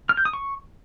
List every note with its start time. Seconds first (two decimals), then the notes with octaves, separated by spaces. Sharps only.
0.09 F6
0.17 G6
0.25 D#6
0.33 C#6